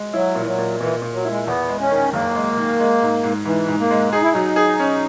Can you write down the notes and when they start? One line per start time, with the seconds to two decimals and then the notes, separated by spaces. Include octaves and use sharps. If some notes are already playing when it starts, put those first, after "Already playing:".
Already playing: G#3
0.13 F#3 E4
0.35 A#2 E3
0.46 F#3
0.58 A#2
0.80 A#2 E3
1.02 A#2
1.13 F#3
1.25 G#3 E4
1.47 E2 B3
1.68 G#3
1.80 C#4
1.91 D#3
2.13 F#1 A#3
2.35 G#3
2.57 D#3
2.80 G#3
3.02 G#2
3.23 G#2
3.45 G#2 E3
3.68 G#2
3.80 A#3
3.91 G#3
4.12 D#4 G#4
4.23 E4
4.32 F#3 D#4
4.56 G#4
4.79 C#4